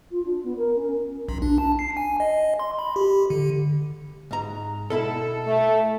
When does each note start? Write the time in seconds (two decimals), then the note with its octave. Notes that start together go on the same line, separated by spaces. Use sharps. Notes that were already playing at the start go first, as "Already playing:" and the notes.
0.11 F4
0.25 D4
0.43 B3
0.57 A#4
0.75 C#4
1.29 B1
1.42 D4
1.58 A5
1.79 C7
1.97 G#5
2.20 D#5
2.59 C6
2.79 B5
2.96 G4
3.30 D3
4.31 G#2 A#5
4.90 B2 E4 A4 B5
5.47 A3 E5